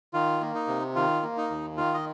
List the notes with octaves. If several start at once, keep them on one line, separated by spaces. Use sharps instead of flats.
D#3 F4
A#3
D#4
C3
D#3 F4
A#3
D#4
D#2
D#3 F4
D#5